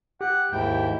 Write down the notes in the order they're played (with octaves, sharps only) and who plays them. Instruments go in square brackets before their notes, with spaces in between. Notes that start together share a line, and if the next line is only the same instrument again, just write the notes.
[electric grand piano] G4 [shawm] F#5
[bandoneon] D#2 G#2 [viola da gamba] E4 [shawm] G5